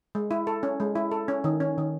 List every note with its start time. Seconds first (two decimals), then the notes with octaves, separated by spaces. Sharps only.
0.15 G#3
0.31 E4
0.47 A4
0.63 C#4
0.80 G#3
0.95 E4
1.11 A4
1.28 C#4
1.44 D#3
1.60 C#4
1.78 D#3